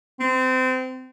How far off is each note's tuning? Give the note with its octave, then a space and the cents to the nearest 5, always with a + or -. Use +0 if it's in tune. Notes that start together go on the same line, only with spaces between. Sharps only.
C4 -25